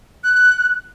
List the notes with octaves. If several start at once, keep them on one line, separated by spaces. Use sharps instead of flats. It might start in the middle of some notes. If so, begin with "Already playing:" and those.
F#6